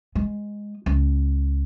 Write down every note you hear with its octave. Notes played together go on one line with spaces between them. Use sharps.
G#3
C#2